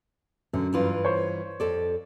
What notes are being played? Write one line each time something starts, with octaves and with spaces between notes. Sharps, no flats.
F#2 D3
G2 E3 F4
C5 C#5
F2 A4 D5